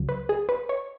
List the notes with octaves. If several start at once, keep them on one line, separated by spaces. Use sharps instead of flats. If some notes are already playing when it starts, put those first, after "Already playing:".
Already playing: C#2 C#3 F#3
B4
G#4
B4
C#5